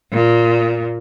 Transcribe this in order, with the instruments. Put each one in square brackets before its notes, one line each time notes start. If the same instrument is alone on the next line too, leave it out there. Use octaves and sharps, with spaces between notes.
[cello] A#2